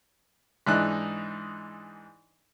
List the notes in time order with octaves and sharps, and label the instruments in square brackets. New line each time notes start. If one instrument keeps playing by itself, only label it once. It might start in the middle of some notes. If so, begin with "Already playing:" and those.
[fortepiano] G#2 E3 D4 D#4 F#6